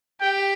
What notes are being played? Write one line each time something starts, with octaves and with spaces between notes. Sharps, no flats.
G4 G5